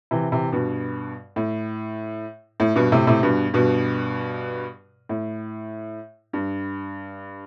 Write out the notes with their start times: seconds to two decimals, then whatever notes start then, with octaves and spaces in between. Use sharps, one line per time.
0.11 C3 E3
0.32 C3 E3
0.52 G2 B2
1.36 A2
2.60 A2
2.75 G2 B2
2.92 A2 C3
3.07 A2 C3
3.23 G2 B2
3.54 G2 B2
5.09 A2
6.33 G2